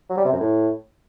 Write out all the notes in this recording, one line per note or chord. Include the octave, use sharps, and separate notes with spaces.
F#3
G3
C3
F#2
A2